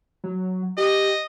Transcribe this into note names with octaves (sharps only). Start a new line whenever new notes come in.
F#3
G4 D#5